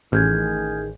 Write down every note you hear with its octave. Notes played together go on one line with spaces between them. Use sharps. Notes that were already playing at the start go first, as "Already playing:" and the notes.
A1 D#3 G#4 F6 G6 G#6